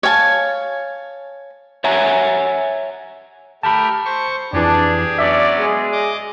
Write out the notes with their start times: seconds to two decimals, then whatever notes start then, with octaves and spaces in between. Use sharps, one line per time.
0.03 C#5 F5 G#5 A5
1.84 C#5 E5 F#5 G#5 A#5
3.63 A3 G4 A#4 A5 B5
4.05 C5 C#6
4.53 F2 E3 D4 G4 G#4
5.18 F#3 B3 C#4 D5 E5
5.58 G#3 G#4
5.92 D#5 D6